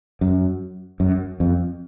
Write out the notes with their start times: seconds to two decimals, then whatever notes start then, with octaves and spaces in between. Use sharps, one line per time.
0.21 F#2
1.00 F#2
1.40 F2